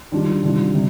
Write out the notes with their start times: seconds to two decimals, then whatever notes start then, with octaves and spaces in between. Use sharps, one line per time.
0.12 D#3 G3 D4 F4
0.42 C3 D#3 G3 D4 F4
0.74 C3 G3